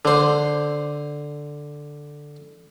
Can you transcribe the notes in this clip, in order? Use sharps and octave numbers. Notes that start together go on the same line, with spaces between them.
D3 C5